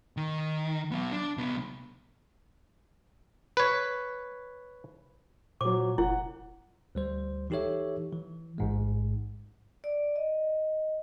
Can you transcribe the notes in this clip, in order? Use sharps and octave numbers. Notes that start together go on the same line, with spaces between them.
D#3
F#3 B3
D4
C2 B3
B4 C#5
A#2 F#3 C5 D6
F1 E4 F#5
D2 G3 C5
E3 D#4 G4 A4 C#5 E5
E3
A1 G#2 G#3
D5
D#5